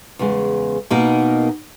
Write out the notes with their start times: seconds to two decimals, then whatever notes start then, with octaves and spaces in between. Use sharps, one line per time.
0.19 E2 C#3 G#3
0.91 B2 A#3 D#4 A#4